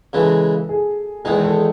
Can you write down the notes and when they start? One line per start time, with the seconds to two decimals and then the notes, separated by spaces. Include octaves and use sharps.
0.13 C#3 E3 G#3 A4
0.69 G#4
1.25 E2 D#3 G#3 D#4 G#4
1.44 A4